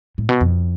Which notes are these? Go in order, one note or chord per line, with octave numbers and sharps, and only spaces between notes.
A2
B2
F2